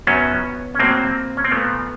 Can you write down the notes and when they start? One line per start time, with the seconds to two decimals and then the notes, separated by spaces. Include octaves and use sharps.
0.07 F#2 D#3 F#3 B3 C#4
0.75 C#4
0.79 A2 F#3 A#3 C4
1.37 C#4
1.44 C4
1.52 A#2 F3 A3 B3